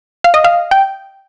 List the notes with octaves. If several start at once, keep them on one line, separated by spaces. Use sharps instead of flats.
F5
D#5
F5
G5